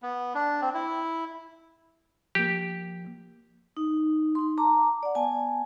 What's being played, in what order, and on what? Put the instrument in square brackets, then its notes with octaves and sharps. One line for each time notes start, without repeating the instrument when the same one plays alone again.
[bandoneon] B3
D4
C4
E4
[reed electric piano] F3 A#3 [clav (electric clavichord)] G4
[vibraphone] D#4
D#4 C6
A5 A#5 D6
D5 F#5
B3 G#5 A5